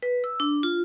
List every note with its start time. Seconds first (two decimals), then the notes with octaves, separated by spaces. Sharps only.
0.03 B4
0.24 E6
0.40 D4
0.63 F4